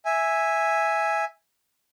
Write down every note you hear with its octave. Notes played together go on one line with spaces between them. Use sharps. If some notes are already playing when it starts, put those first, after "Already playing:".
E5 G#5